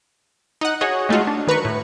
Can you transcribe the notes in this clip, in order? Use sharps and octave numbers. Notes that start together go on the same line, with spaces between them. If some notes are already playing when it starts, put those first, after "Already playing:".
D#4 D#5 F#5
F#4 G#4 C#5 D#5
G#3 A3 D#4 F4 F#4
D4
D#3 B4 A#5 C#6
A2